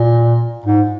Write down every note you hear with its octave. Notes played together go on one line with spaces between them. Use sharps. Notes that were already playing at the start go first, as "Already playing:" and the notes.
Already playing: A#2
G#2